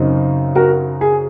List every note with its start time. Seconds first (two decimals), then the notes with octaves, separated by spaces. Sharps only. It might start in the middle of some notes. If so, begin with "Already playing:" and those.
Already playing: F#2 C#3 F#3 C4 D#4
0.55 F#4 A#4
1.01 G#4